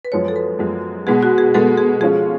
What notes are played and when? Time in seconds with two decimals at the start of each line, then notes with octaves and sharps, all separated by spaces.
0.05 B4
0.12 F#2 F3 G#3 C#5
0.28 A4
0.36 B4
0.59 F#2 F3 G#3
1.07 B2 G#3 B3 G#4
1.23 F#4
1.38 G#4
1.54 B2 G#3 B3 A4
1.77 G#4
2.00 F3 G#3 C#4 F4 G#4